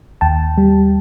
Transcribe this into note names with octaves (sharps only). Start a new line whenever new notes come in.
D#2 G5 A5
G3